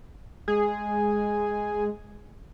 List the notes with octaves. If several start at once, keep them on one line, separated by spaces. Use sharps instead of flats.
G#3 G#4